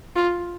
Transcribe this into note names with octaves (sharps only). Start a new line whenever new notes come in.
F4